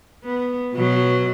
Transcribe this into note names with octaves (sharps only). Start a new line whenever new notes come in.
B3
B2 F#3